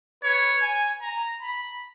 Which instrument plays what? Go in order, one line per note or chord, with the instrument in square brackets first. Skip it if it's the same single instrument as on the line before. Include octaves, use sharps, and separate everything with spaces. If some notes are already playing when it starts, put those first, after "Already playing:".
[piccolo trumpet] B4 [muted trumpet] C#5
[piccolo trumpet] G#5
A#5
B5